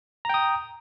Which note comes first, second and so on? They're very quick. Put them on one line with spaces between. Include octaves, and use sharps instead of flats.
A#5 G5 D#6